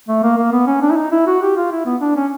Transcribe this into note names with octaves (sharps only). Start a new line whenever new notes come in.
A3
A#3
A#3
B3
C#4
D4
E4
D#4
E4
F#4
G4
F4
E4
B3
D4
C#4